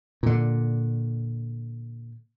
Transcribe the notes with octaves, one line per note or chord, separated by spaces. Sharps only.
A#2 D3